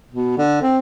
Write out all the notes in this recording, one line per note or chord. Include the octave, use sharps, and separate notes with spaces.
B2
D3
C4